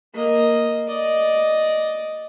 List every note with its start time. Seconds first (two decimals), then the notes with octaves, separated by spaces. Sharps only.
0.14 A#3 D#5
0.88 D5 D#5